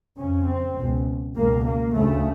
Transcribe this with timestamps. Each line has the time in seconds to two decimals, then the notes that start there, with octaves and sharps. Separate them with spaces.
0.18 F2 C#3 C#4
0.48 C4
0.77 C#2 B2
1.36 C#2 B2 A#3
1.65 A#3
1.94 D2 C#3 A3